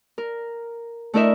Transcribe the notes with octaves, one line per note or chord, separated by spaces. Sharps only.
A#4
A3 D4 E4 A#4 D#5 E5